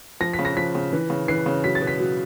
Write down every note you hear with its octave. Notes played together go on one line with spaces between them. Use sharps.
F3 A#6
B6
C#3
A#6
F3 B6
C#3
E3
C#3
E3 C7
C#3
F#3 B6
A6
B2
B6
F#3